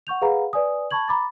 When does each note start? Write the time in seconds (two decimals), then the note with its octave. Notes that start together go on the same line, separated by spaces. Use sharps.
0.07 F#5 C#6 G6 F7
0.22 G#4 B4 F5 F#5 A#5 B5
0.53 B4 D5 G#5 D#6
0.91 A5 B5 C#6 G#6 F#7
1.08 A#5 B5 D6 A6